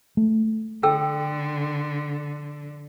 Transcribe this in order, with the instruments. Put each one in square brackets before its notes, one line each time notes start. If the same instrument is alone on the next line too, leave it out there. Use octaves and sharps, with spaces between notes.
[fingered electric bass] A3
[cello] D3 [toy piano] A4 G5 E6